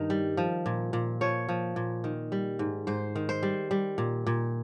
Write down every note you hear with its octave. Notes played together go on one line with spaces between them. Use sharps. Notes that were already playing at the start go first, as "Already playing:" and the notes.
Already playing: G2 D#3 D#4
G3
F3
A#2
A#2
F3 C#5
F3
A#2
D#3
G3
G#2
G#2 C5
D#3
C5
G3
G3
A#2
A#2